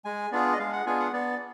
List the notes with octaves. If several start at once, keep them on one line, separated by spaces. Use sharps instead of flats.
G#3 G#5
B3 D4 F4 G#4 D5
D#5
G#3 F5
F#5
B3 D4 F4 G#4 G#5
F#5
B3 D5